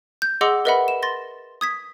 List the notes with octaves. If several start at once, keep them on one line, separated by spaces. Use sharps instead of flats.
G6
G#4 D#5 F#5 C6 D6 E6
A#4 B4 D#5 E5 F#5 B5
E7
C6 A6 A#6
D#6 G#6 B6